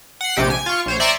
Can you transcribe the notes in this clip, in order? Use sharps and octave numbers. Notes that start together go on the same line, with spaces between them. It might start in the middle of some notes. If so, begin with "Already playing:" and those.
F#5 C7
A#1 C3 G4 D7
G#5
F4 C#6
A#1 C5 C#5
D5 E5 G#5 A#5 C6 C#6